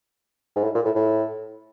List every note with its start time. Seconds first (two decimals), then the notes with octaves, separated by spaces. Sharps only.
0.56 G#2
0.64 A2
0.75 A#2
0.85 A2
0.96 A2